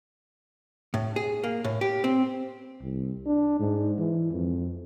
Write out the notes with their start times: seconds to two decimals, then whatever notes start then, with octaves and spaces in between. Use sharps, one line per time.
0.94 A2
1.16 G#4
1.44 A#3
1.64 A2
1.81 G4
2.04 C4
2.82 C2
3.26 D4
3.60 G#2
3.98 E3
4.32 F2